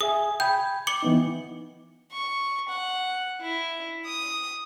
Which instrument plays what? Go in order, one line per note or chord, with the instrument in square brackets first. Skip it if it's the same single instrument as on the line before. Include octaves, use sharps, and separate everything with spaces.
[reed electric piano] G#4 E5 G#5 [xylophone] D#6
[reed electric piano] G5 B5 G#6 [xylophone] G6
[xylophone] D6 C#7 F#7
[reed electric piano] E3 B3 D#4
[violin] C#6
F#5
E4
D#6